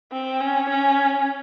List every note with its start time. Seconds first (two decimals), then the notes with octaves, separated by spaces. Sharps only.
0.12 C4
0.40 C#4
0.70 C#4